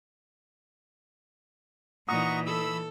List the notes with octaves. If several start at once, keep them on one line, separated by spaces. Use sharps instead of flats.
A#2 E3 D#4 F#5 A#5 C#6 D#6
A4 B5 E6